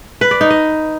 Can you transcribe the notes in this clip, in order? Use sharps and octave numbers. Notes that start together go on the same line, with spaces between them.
B4
D5
D#4
D#5